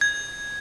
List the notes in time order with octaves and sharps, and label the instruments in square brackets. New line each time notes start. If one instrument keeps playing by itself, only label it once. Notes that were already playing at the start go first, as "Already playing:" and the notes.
[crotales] G#6